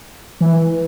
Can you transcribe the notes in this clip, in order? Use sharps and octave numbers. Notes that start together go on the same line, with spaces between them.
E3